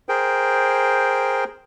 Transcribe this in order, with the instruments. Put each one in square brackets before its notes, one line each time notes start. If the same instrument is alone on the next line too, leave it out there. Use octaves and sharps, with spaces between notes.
[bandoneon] G#4 A#4 C5 G5